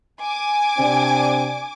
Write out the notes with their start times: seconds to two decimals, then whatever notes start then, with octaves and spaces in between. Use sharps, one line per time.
0.19 G#5 D6
0.79 C3 C4 D4